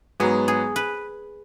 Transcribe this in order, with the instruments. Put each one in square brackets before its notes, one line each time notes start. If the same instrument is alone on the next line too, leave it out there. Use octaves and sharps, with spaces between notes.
[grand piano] G#2 F#3 B3 [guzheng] G#4
[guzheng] G#4
B4